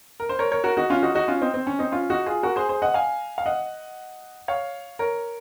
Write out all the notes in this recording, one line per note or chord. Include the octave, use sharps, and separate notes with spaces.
A#4
C5
A#4 C#5
A#4 C#5
F#4 A#4
D#4 F#4
C#4 F4
D#4 F#4
D#4 F#4
C#4 F4
C4 D#4
C4
C#4
C4 D#4
C#4 F4
D#4 F#4
F4 G#4
F#4 A#4
G#4 C5
G#4 C5
D#5 F#5
F5 G#5
F5
D#5 F#5
C#5 F5
A#4 C#5